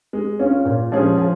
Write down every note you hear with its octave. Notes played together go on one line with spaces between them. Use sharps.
G#3
C#4 F4
A#2
F3 G#3 C#4 G#4
F3